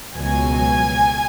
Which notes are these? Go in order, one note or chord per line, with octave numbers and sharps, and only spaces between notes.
C#2 B2 F#3 G#5